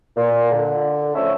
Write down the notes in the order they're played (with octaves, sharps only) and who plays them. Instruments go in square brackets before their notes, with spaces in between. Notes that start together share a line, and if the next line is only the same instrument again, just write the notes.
[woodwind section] A#2
D3
F3 A3 C#4 C#5 E5